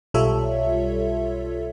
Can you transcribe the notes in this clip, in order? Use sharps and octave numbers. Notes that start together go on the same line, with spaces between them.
B1 G3 F4 A4 C#5 E5